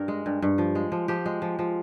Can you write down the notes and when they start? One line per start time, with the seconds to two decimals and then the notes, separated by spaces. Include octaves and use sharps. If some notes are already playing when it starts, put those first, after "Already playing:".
Already playing: G2 A#4
0.08 G#3
0.26 G2
0.42 G2
0.58 F3
0.75 G#3
0.92 F3
1.08 F3 G4
1.26 G#3
1.42 F3
1.59 F3